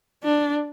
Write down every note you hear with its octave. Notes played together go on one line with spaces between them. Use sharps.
D4